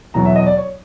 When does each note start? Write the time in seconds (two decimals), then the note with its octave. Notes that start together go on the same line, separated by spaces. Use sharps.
0.14 E2 B2 F#3 A#5
0.25 E5
0.36 D#5
0.46 D5
0.57 C#5